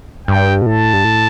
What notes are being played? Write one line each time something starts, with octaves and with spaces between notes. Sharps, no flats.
G2 G5
B2
A2 A5
G2
A2